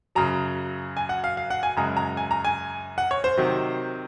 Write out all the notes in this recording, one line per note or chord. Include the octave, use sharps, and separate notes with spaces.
F#2 C#3 F#3 A#5
G#5
F#5
F5
F5
F#5
G#5
F#2 C#3 G#3 A#5
A#5
G#5
A#5
G#5
F#5
C#5
C5
C3 D#3 F#3